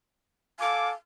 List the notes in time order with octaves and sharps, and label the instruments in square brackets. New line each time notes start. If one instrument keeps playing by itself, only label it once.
[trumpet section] A4 G#5 D6 [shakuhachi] F5